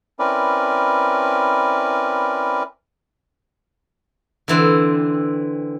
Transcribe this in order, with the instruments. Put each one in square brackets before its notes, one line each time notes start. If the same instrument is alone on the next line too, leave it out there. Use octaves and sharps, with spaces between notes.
[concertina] C4 C#4 E4 A#4 B4 D5
[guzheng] D3 E3 C4